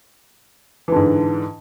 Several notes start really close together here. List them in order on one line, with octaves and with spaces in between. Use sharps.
E3 D3 G#2